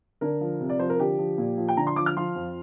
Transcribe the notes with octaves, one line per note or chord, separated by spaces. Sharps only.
D3 A#4
F3
C3
D5
F3 C5
A#4
D3 G4
F3
A#2
F3
G5
D3 A#5
C6
F3 D6
F6
F3 C6
F2